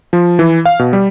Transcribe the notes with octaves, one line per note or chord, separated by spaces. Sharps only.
F3
E3
F5
B2
G3